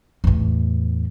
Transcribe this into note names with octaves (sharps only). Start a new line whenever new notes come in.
E2 A2